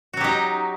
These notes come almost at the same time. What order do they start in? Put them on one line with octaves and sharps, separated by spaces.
F#4 F#3 G4 D#4